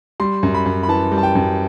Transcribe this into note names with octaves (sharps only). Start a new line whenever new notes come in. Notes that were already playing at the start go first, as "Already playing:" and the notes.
G3 C6
F#2
B5
F#2
B5
E3 A5
G3
A5
G5
F#2